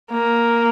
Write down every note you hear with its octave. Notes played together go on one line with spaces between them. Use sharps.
A#3